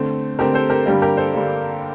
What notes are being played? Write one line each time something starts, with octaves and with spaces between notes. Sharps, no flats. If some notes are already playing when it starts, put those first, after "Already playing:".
Already playing: D3 A3 C4
D3 A3 C4 G4 A#4
A4 C5
G4 A#4
G2 D3 G3 A#3 G4
G4 A#4
A4 C5
G2 D3 G3 A#3